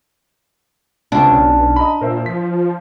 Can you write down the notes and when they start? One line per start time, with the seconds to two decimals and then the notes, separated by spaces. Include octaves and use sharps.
1.12 C#2 C3 D4
1.32 B1 C#4
1.76 D#5 A#5 B5
2.01 A#2 A#4 C5 E5
2.26 F3 B6